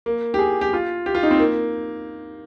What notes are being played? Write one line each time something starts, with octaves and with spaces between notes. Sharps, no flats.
A#3
G4
G#4
G4
F4
G4
F4
D#4
C4
A#3